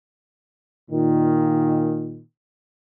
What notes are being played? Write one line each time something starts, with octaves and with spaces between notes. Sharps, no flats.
A#2 D#3